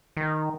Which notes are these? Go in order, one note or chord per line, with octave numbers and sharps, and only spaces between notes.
D#3